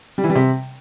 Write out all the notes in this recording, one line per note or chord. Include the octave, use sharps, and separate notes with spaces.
G3
E3
G3
C3